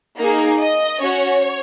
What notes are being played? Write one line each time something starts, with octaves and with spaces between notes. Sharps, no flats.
A#3 D#4 G#4
D#5
C#4 F#4 C#5